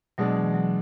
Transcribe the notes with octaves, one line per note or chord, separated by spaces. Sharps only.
B2 F#3 G#3 D4
E3
F#3